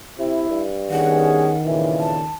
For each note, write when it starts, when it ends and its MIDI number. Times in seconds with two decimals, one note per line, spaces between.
0.19 0.47 48
0.19 0.62 64
0.49 1.53 43
0.91 2.33 51
0.91 1.54 59
0.91 1.54 61
0.91 1.54 68
0.91 1.59 78
1.65 2.23 41
1.65 2.23 46
1.65 2.23 49
1.65 2.16 52
1.99 2.35 81